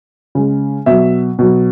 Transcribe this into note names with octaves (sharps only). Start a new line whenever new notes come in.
C#3 G#3
B2 F#3 E5
B2 F#3